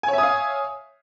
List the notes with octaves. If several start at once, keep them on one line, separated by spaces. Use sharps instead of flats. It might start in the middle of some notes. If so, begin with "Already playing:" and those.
C#5 E5 F5 G#5 D#6